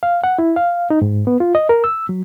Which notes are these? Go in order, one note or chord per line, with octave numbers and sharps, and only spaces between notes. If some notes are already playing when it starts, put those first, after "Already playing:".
F5
F#5
E4
F5
D#4
G#2
B3
F4
D#5
A#4
E6
F#3